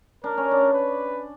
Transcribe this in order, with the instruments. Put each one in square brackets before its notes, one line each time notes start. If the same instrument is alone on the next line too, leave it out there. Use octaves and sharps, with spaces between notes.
[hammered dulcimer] D4 [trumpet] A#4
[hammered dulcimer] C#4
D4
[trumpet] B4